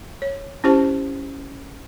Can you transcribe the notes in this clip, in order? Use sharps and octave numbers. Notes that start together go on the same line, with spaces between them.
C#5
C#4 E4 G4 C5 A5